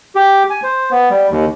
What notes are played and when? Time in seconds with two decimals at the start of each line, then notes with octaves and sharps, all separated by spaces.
0.15 G4
0.50 G#5
0.63 C5
0.91 B3
1.10 G3
1.30 D#2